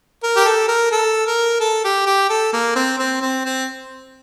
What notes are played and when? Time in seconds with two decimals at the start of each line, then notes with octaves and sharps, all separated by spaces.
0.23 A#4
0.36 G4
0.45 A4
0.68 A#4
0.91 A4
1.27 A#4
1.60 A4
1.84 G4
2.06 G4
2.30 A4
2.53 A#3
2.75 C4
2.98 C4
3.21 C4
3.45 C4